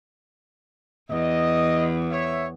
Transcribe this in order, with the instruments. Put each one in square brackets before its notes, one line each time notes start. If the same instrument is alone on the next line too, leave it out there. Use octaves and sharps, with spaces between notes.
[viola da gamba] E2 [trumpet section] D#5
[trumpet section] C#5 E5